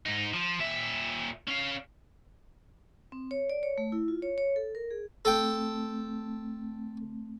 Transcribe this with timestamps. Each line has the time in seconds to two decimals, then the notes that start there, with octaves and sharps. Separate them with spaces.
0.06 G#2 D#4
0.33 F3
0.59 A#2 E5
1.48 C#4 F5
3.12 C4
3.31 C#5
3.50 D5
3.63 C#5
3.78 A3
3.92 E4
4.08 F4
4.22 C#5
4.38 C#5
4.56 A4
4.75 A#4
4.91 G#4
5.25 A3 C4 A4 G5